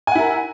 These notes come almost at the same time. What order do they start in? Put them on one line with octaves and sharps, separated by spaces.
G#5 F#5 E4 A#4